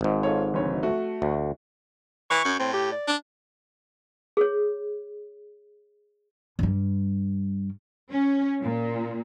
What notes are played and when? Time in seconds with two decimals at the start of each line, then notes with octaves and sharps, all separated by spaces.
0.01 G#1 G#2
0.23 F4 A4 C#5
0.54 F1 D2 C#5
0.83 A3 F#4
1.22 D2
2.30 E3 C#6
2.44 F#2
2.59 A2 C4
2.74 G4
2.92 D5
3.08 D4
4.37 G#4 C#5
6.59 G2 G3
8.11 C#4
8.62 A#2